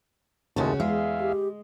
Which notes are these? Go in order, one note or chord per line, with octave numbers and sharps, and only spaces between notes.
D#2 A2 C#3 G#3 C#4 F#4 A5
E2 G#3 G#4 E5 F5
G4